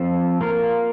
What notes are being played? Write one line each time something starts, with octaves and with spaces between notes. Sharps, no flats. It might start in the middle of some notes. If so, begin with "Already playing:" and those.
Already playing: F3 C4 F4 A4
A#3 F4 A#4